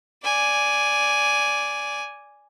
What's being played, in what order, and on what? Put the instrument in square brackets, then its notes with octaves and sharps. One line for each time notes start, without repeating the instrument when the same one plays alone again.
[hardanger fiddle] D5 G#5